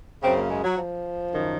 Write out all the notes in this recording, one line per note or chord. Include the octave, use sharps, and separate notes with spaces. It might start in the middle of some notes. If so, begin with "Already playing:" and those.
F#2 C#3 C4
A#3
G#3
F#3
F3
F#2 D#3